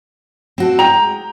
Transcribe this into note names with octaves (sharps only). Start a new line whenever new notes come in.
C4 F#4 A4
G#3 G5 A#5 F7